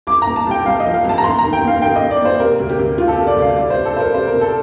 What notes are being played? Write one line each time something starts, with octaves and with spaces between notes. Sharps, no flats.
C2 D6
A#5
A#2
A5
C2 G5
C2 F5
D#5
F3
F5
C2
A5
A#5
D#2 C6
D#3 A#5
G5
D#2 F5
D#3 G5
D#5
D#2
D5
D#2
C5
C3 A#4
D2
G4
D2
D2 F4
A4
G4
C3
D5
D2
F5
C2 D5
C5
C2
A4
C2 A#4 C5
C3 C5
A#4
C3
A4